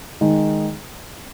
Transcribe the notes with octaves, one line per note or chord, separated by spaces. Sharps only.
D#3 G#3 D#4 G#4